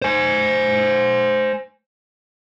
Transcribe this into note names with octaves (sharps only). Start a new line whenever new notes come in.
C5 G#5